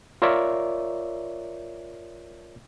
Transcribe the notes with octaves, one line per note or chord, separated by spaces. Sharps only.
F4 A#4 C#5 D5 E5